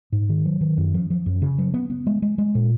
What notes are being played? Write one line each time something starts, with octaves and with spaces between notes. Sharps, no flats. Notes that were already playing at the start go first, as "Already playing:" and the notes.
G#2
D#3
F#3
D#3
F#2
F3
F3
F#2
C#3
F#3
B3
B3
G#3
G#3
G#3
A#2